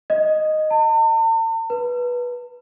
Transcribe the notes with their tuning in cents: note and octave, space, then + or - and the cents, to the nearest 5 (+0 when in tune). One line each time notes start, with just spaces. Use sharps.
D#5 -5
A5 +45
B4 -15